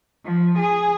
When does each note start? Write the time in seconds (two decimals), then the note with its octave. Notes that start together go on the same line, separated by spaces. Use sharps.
0.25 F3
0.59 G#4